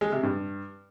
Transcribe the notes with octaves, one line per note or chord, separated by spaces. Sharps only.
G#3
C3
G2